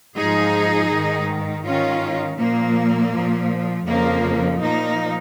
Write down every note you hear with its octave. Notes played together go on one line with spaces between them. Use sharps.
G#2 F3 D#4 G#4
G#2 D#3
G#2 D#3 C#4 F4
A#2 F3 A#3
F3
A#2
F2 C#3 F3 A#3
A#2 F3 A#3 D#4